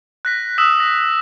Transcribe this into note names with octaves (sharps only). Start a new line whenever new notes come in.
F#6 A#6 B6
D#6 E6 F#6 B6 E7
A#6